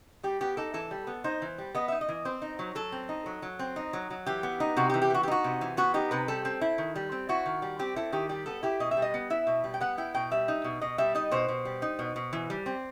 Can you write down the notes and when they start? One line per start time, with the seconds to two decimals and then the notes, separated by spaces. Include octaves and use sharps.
0.23 G3 G4
0.41 B3 G4
0.57 D#4 A4
0.74 E3 A4
0.91 G3
1.07 B3
1.24 D#4 C5
1.42 E3
1.58 G3
1.75 B3 D#5
1.88 D#4 E5
2.01 D#5
2.09 E3
2.25 C4 C5
2.42 D#4
2.59 F#3
2.75 F#3 A4
2.92 C4
3.09 D#4
3.26 F#3
3.42 F#3
3.59 C4
3.76 D#4
3.93 F#3
4.10 F#3
4.26 E3 G4
4.43 B3
4.60 D#4
4.77 C3 F#4
4.90 G4
4.94 E3
5.02 G4
5.10 B3 F#4
5.23 G4
5.28 D#4 F#4
5.44 C3
5.61 E3
5.77 B3 F#4
5.94 D#4 G4
6.11 C3 B4
6.28 G3 A4
6.45 C4
6.61 E4
6.78 D#3
6.96 G3
7.12 C4
7.29 E4 F#4
7.46 D#3
7.62 G3
7.79 C4 G4
7.96 E4 A4
8.13 D#3 G4
8.29 G3 G4
8.46 B3 A4
8.63 E4 G4
8.80 B2 D#5
8.91 E5
8.97 G3
9.02 D#5
9.14 B3
9.30 E4 E5
9.47 B2
9.64 G3
9.74 G5
9.80 B3 F#5
9.98 E4 G5
10.14 B2 G5
10.31 G3 E5
10.48 D#4
10.64 B2
10.81 B2 D#5
10.98 G3 E5
11.15 D#4 D#5
11.32 B2 C5
11.49 B2
11.65 G3
11.82 D#4
11.99 B2
12.16 B2
12.33 E3
12.50 G3
12.66 C4